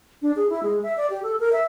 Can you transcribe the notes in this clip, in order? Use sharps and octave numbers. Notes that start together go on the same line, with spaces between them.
D4
G#4
E4
G#3
E5
D5
G4
A4
A#4
E5